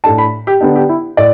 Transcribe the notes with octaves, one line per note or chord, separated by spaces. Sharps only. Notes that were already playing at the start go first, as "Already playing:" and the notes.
A2 A3 D4 A5
B5
G4
D3 B3 D4 G4
G4
E4
A2 D5